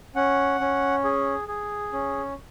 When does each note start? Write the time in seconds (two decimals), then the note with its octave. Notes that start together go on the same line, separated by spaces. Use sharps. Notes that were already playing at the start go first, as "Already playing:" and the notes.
0.16 C#4 F#5
0.60 C#4
1.04 G#4
1.48 G#4
1.93 C#4